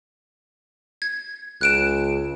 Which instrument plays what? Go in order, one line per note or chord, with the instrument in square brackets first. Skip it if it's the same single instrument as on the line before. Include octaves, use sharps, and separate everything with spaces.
[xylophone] G#6
[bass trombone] C#2 [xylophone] F#6 D7 E7